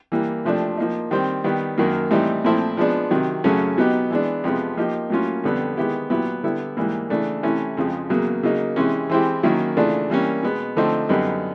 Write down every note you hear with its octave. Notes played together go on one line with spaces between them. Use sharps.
E3 G3 A#3
F2 C3 F3 A3 D4
F3 A#3 D#4
D#3 G3 C4
D#3 G3 B3
F#2 D#3 F#3 A#3
A2 E3 G3 C4 D#4
A#2 F3 A3 C4 E4
F3 G#3 B3 D4
C3 D#3 F#3
F#2 C#3 F#3 A3 C#4
B2 F#3 B3 D#4 G4
E3 G#3 B3 D4
F2 C3 F3 G#3 B3
F3 A#3 D#4 G4
A2 F#3 A#3 C#4 F4
F2 D3 G3 B3
D#3 G#3 B3 E4 G4
A#2 F#3 B3 E4 G4
D3 G3 B3 E4
G#2 E3 G3 A#3
C#3 E3 A3 D4
C3 E3 A3 C#4 E4
F2 C#3 F3 G#3
E2 C#3 F#3 A#3
C#3 F#3 A#3 D#4
C3 E3 G#3 C#4
E3 G#3 C4 E4 G4
D#3 F#3 A#3 C#4 E4
C#3 E3 A3 D4 F4
E3 G3 A#3 C#4
B2 G#3 B3
D3 F3 A3 C4 D#4
F#2 D3 G3 B3 D#4